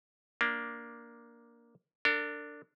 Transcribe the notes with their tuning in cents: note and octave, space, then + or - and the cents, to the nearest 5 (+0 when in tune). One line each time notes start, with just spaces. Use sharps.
A#3 +5 D4 +0
D4 +0 A#4 -45